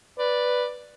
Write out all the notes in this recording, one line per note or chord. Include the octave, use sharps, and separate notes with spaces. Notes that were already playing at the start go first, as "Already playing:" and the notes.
B4 D5